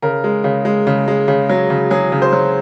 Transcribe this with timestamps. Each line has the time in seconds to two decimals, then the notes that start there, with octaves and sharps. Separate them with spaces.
0.02 C#3 A#4
0.24 G#3
0.44 C#3
0.65 G#3
0.87 C#3
1.08 G#3
1.28 C#3
1.50 F#3
1.70 C#3
1.91 F#3 G#4
2.12 C#3
2.22 C5
2.33 F#3